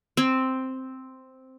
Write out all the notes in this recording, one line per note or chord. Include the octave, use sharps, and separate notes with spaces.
C4